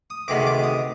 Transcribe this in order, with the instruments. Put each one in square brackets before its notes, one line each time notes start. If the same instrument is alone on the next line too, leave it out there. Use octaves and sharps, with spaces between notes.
[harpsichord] D#6
D2 C3 D#3 G#3 B3 D6
D6
D#6